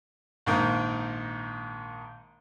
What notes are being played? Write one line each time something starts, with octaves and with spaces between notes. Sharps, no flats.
A#1 G#2 D#3 A#3